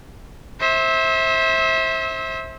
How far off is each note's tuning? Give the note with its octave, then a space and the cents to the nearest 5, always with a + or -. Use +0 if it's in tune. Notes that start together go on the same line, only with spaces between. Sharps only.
C5 +20 E5 -25